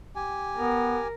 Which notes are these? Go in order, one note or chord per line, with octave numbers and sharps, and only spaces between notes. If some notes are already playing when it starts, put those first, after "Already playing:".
G4 G#5
B3 A#4